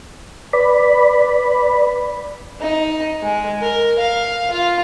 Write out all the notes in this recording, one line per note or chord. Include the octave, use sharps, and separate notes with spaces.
B4 D5 B5
D#4
G#3
A#4
F5
F4